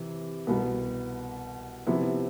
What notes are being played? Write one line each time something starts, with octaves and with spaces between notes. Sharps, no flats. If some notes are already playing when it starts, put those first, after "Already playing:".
Already playing: C3 E3
C2 B2 B3
C3 F3 B3 E4